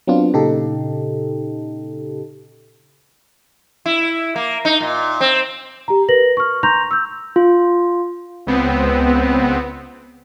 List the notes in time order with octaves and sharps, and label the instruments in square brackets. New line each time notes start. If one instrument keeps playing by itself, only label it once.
[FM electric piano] F#3 B3 C4 D4 F4
A#2 C#3 D#4 G4 A4
[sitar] E4
A#3
D#4
A#2
C4
[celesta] G4 A#5
A#4 B4 A#6 F#7
C#6 F6
A#5 C6 C#6 G6 A#6 F7
E6 G6
[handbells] F4
[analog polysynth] C#2 B3 C4